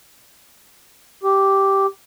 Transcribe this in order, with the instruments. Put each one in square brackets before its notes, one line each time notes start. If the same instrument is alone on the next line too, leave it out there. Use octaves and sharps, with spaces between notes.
[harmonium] G4